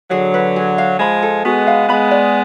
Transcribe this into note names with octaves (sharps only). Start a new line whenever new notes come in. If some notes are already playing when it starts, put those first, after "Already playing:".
D3 F#3 G#4
B4
G#4
F5
F3 G#3 B5
A4
G#3 B3 F#4
F5
G#3 B3 B5
D5